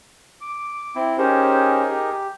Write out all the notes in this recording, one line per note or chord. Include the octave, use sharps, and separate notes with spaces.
D6
C4 E4
C#4 D#4 G4 G#4 A#4 C5
G4